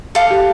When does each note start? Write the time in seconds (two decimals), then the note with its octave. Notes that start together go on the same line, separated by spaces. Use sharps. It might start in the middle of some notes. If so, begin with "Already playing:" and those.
0.15 A4 F5 D6
0.30 G4